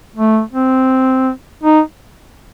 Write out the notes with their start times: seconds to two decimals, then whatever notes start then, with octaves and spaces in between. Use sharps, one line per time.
0.16 A3
0.53 C4
1.64 D#4